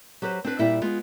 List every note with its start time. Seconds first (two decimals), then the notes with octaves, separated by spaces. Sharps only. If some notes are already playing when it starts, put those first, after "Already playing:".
0.22 F#3 G4 A4 B4 C5
0.44 C4 D4 B4
0.59 A#2 G3 E4 E5 G5
0.82 G#3 B3 F4